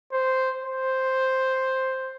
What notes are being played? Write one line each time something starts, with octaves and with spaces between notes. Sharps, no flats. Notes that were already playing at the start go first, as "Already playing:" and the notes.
C5
C5